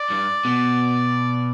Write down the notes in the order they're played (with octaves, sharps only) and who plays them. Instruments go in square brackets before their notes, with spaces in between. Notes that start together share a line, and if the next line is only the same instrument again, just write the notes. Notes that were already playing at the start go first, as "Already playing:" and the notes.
Already playing: [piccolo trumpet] D5
[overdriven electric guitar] G2
B2